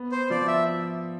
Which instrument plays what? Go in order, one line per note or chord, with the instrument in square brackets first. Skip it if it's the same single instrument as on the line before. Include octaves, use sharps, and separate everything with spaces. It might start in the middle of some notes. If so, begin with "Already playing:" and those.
Already playing: [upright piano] B3
[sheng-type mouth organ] C5
[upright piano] F3 [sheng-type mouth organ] D5
[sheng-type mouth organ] E5